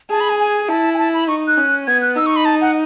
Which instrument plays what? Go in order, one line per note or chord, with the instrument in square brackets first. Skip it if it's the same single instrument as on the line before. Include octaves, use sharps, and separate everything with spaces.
[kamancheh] G#4 [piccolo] A5
[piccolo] B5
G#5
G#5
[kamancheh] E4 [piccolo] A5
[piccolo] G#5
A5
B5
[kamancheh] D#4 [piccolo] C#6
[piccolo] F#6
[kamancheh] C#4
[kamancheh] B3 [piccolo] G#6
[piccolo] F#6
[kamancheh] D#4 [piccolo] E6
[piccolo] C#6
B5
A5
F#5